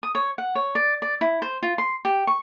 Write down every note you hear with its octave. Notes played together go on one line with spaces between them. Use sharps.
D#6
C#5
F#5
C#5
D5
D5
E4
C5
F4
C6
G4
C#6